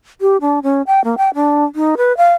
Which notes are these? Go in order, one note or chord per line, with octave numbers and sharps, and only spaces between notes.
G4
D4
C#4
G5
A#3
G5
D4
D#4
B4
F5